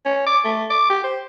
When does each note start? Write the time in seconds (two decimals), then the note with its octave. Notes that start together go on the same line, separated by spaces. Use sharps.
0.05 C#4
0.26 D6
0.44 A3
0.70 D6
0.90 G4
1.04 C5